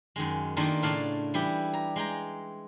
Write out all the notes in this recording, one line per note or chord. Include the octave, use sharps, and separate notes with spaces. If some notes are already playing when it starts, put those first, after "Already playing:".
F#2 D#3 G#3
D#3 A3 A#3 D4 F4
A2 C#3 D4 F5 A5
E3 G3 E4 G4
A#5
G#3 G5 A#5